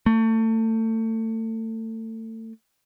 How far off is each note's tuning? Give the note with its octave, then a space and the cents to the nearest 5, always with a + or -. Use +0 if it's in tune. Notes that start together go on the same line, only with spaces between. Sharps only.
A3 +30